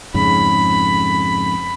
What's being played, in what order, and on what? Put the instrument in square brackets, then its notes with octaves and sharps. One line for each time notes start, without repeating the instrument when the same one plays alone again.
[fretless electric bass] F2 G#2 C#3 [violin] B5